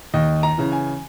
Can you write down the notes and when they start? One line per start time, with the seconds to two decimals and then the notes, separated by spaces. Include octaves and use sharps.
0.14 D#2 D#5
0.43 A#5
0.58 C#3 E3
0.72 G#5